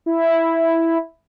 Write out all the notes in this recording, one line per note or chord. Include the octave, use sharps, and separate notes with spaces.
E4